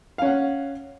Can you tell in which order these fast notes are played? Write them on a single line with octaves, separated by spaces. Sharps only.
F5 C#4 F#5